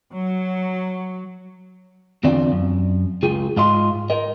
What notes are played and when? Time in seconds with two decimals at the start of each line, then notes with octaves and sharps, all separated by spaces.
0.12 F#3
2.24 E2 D3 C4 D4 F4 D5
2.52 F#2
3.22 C#2 F4 G4 G#4
3.57 G#2 F4 D#5 C6
4.10 A#4 D#5